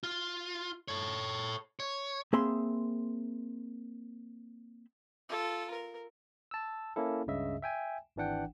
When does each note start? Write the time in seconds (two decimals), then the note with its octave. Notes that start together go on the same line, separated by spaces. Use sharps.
0.03 F4
0.88 A4 C#5
1.80 C#5
2.33 A#3 C4 G#4 E5 B5 C6
5.29 F4 A4
5.70 A#4
6.51 A5 E6
6.96 A#3 C#4 E4 A4
7.27 C#2 G2 C#3 D#5 E5
7.62 E5 G5 G#5
8.16 G#1 E3 D4 F#5 G5